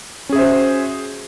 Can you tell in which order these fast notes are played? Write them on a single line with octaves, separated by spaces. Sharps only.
C#4 G#4 E5 C5 F#4